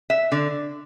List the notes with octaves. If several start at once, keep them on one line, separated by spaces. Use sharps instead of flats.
E5
D3